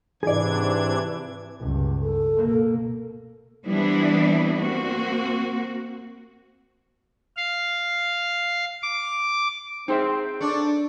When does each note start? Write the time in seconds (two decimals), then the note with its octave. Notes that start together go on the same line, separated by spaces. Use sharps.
0.23 G#2 C3 E3 D4 G#4 D5 G#6
1.59 C#2 G2
2.02 A4
2.37 B2 A#3
3.66 E3 G3 B3 C4 D4 E4
4.60 A#3 C4 F#4
7.37 F5
8.83 D6
9.88 C4 D#4 G#4 E5
10.41 D4 A4 C#5 D5